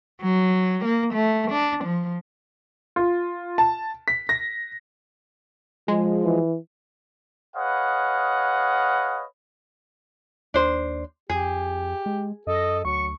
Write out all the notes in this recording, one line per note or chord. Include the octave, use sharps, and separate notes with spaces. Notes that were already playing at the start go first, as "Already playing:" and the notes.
F#3
A#3
A3
D4
F3
F4
A5
B6
A#6
F3 G#3
E3
G#4 B4 C#5 D#5 F5 F#5
D#2 D4 C5
F2 G4 G#4
G#3
F#2 A4 D#5
D2 F#3 C#6